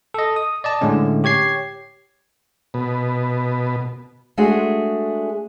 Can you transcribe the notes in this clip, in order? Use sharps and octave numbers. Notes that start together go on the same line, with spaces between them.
A4 D#5
D#6
D5 D#5 A5
A2 D3 G#3 C#4
G4 C#5 G#6 C7
B2
G#3 A3 D4 F#4 G#4